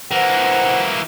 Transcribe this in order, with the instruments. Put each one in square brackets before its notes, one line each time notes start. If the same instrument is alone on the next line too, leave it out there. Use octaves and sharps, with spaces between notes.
[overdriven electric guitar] E3 A#3 [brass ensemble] C5 F#5